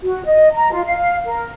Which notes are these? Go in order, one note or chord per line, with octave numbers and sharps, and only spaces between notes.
F#4
D#5
A#5
F4
F5
A#4